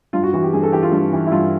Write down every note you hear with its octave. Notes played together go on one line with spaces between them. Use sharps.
G2 F4
F#4
E3 F#4
G4
G2 G#4
A4
E3 G4
F4
G2
E3
E4
G2 F4